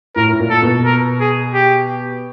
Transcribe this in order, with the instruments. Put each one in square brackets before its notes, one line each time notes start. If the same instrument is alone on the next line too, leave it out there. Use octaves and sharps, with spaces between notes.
[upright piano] A2 [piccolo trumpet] A#4
[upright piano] A2
A#2
[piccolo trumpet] A4
[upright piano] B2
[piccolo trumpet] A#4
G#4
G4